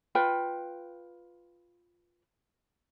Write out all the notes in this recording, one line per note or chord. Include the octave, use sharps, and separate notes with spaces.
F4 B4 G5